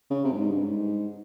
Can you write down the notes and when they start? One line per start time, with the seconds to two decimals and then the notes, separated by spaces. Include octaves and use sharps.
0.10 C#3
0.24 C3
0.33 G2
0.37 G#2
0.50 G2
0.63 G#2